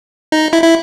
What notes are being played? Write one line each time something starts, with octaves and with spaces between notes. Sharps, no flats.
D#4
E4
E4